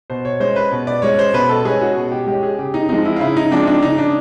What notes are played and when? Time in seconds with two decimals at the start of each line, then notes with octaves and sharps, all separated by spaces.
0.10 B2 C5
0.25 C#5
0.40 G#3 C#4 C5
0.56 B4
0.72 B2
0.87 D5
1.02 G#3 C#4 C#5
1.19 C5
1.33 B2 B4
1.49 A4
1.65 G#3 C#4 G#4
1.81 F#4
1.96 B2
2.11 G4
2.27 G#3 C#4 G4
2.43 G#4
2.59 C#3 G4
2.74 D#4
2.89 F3 G#3 C4 D#4
3.05 E4
3.16 F4
3.20 C#3 E4
3.37 D#4
3.52 F3 G#3 C4 D4
3.67 D4
3.82 C#3 D#4
3.98 D4